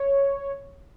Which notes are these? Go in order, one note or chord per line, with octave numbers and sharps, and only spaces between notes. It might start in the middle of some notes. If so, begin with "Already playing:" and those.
Already playing: C#5